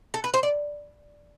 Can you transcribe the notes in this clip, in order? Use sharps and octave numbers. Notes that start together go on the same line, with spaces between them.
A4
B4
C5
D5